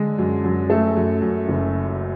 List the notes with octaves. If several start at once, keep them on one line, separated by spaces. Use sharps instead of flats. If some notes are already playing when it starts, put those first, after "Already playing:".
Already playing: D3 G#3
F#2
F#2
A3 A4
F#2
F#2
F#1